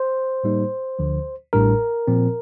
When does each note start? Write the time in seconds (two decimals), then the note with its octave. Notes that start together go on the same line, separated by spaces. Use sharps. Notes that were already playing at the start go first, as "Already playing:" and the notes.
Already playing: C5
0.44 A2 G3 A#3 D#4
0.99 D2 D3 F3
1.53 A1 A2 G3 D4 A#4
2.07 A#2 F3 C4